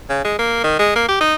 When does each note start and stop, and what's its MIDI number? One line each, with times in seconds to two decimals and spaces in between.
0.09 0.20 49
0.25 0.38 56
0.39 0.63 58
0.64 0.75 51
0.79 0.91 56
0.96 1.04 58
1.09 1.20 67
1.21 1.35 63